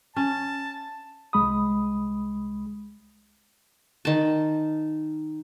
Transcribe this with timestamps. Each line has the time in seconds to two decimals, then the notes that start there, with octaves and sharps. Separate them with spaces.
0.16 C#4 A5
1.33 C2 G#3 B5 D#6
4.05 D#3 A5